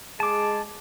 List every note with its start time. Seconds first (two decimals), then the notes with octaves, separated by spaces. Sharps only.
0.20 G#3 G#4 A5 D6